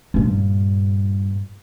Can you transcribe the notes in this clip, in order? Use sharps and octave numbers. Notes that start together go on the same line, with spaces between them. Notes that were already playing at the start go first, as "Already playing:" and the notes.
G2 A#2